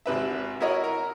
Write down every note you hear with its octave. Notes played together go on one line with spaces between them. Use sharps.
G#1 C3 B4 E5
E4 F#4 A#4 C#5 D#5
A#4